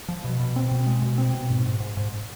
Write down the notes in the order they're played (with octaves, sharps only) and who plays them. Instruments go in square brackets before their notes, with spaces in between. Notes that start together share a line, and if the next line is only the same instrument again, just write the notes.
[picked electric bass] F3
B2
B2
C4
B2
G#3
B2
C4
B2
G#2
G#2
G#2
G#2